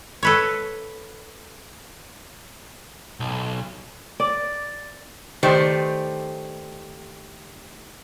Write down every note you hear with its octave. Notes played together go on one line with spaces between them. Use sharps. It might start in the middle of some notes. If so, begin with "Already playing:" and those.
A4 B4 C#5
B1
D5
D#3 A3 G4 B4 C5 D5